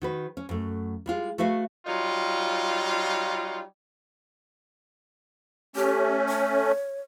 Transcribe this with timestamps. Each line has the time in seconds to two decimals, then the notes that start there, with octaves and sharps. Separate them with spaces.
0.02 D#3 F#4 B4
0.37 C#4
0.49 F#2 A3
1.06 G3 G#3 F4
1.38 A3 F#4 B4 E5 F5
1.87 F#3 G3 D#4 F4
5.76 A3 C#4 G4
6.29 C#5